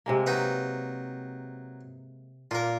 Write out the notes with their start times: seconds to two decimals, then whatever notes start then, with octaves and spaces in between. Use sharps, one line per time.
0.06 C3 G#3 A#3
0.26 F#3 D#4 B4
2.51 A#2 A#3 F4 A#4